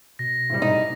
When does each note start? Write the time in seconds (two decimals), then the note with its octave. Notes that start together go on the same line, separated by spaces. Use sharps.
0.19 B2 A#6
0.50 A2 C3 G3
0.62 D#4